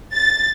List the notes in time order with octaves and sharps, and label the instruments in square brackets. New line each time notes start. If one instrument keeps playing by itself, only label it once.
[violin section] A6